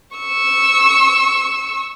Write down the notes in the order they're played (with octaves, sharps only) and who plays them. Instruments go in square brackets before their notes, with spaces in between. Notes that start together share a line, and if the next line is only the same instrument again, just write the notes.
[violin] C#6 E6